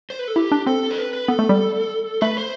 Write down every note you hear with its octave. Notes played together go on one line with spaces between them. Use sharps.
C5
B4
A4
E4 G4
D4
C4 A4
C5
B4
B4
B3 A4
A3
G3
A3 B4
C5